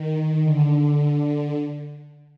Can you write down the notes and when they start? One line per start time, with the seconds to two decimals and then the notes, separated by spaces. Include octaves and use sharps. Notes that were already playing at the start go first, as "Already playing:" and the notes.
Already playing: D#3
0.44 D3